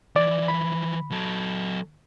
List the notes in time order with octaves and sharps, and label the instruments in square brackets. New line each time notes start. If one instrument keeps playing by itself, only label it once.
[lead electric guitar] E3 F3 [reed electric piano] D5
[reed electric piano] B5
[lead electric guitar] F#3 A4